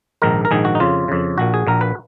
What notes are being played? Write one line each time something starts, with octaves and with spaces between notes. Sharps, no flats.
A#1 G#2 D#3 A#4
A#4
A#1 G#2 D#3 G#4
F#4
D#4
F2 C#3 F4
F2 C#3
A#1 A#2 F#4
G#4
A#1 A#2 A#4
B4